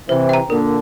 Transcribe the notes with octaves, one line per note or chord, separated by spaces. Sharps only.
C3 E3 C5
G5 A#5
A#2 D3 A#4